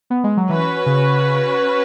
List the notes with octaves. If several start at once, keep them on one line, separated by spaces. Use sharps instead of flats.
B3
G#3
F#3
E3 C#4 F#4 B4
C#3